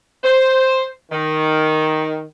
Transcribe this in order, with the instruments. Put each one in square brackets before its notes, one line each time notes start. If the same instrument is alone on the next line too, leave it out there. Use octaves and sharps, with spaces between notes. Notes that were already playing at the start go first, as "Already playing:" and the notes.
[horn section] C5
D#3